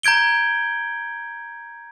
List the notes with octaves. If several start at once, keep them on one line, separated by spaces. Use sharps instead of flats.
A#5 G6 G#6 D7 G7